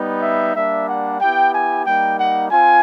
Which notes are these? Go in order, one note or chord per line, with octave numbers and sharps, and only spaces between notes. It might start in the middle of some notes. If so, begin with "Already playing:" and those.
Already playing: G3 B3 D#4
E5
G3 A#3 D4 E5
F#5
B3 E4 G4 G5
G#5
G3 A#3 D#4 G5
F#5
C4 F4 G#5